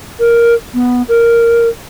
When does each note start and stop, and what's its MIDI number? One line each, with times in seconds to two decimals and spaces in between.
0.19 0.54 70
0.74 1.02 59
1.08 1.68 70